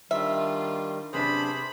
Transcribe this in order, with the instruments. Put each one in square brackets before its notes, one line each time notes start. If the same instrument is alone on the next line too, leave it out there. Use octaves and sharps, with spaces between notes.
[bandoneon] D#3 G3 [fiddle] D4 F4 [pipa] E5
[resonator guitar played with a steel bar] F#2 B3 D4 [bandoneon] C3 G#4 C5 [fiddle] B5